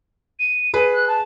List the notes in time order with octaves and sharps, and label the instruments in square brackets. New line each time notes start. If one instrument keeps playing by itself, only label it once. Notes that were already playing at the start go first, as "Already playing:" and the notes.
[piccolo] D#7
[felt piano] G#4 B4
[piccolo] F#6
A5